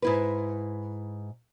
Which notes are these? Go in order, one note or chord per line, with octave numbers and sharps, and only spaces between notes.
G#2 E4 B4